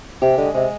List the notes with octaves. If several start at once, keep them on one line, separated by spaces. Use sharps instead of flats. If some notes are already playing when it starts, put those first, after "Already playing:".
C3 G4
D3 G#3
C3 G#3